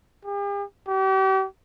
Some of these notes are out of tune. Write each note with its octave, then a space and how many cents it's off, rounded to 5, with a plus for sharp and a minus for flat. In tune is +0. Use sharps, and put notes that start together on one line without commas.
G4 +45
G4 -40